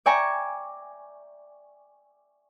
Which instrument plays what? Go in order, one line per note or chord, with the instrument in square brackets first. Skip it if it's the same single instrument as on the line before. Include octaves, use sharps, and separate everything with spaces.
[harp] D5 E5 G5 G#5 A#5 C#6